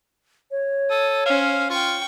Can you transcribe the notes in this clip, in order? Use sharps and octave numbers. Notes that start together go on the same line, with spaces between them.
C#5
A4 D#6
C#4 C5 F5
F4 G5 C#6